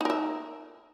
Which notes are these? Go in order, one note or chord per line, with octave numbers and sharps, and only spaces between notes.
D#4 A#4 E5